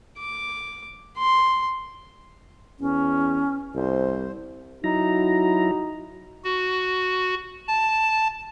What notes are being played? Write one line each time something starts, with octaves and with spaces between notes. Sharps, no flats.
D6
C6
E2 C#4
C2 C5
F#3 D#4 E4 F#4 A#5
F#4
A5